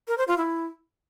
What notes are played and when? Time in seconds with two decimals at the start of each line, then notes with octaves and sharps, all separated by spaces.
0.08 A#4
0.18 C5
0.28 F4
0.38 E4